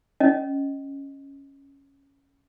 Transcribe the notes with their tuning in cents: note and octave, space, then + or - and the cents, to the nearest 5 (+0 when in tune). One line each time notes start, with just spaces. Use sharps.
C#4 +0 D#5 +0